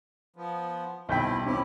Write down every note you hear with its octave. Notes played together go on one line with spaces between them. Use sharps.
F3 B3
D#1 B1 C4 E4 G5 G6 B6
C4 C#4 E4 G4